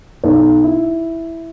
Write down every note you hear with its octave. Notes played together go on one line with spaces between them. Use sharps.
B1
E4